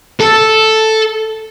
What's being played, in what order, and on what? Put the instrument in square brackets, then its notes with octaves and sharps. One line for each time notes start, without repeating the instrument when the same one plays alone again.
[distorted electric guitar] A4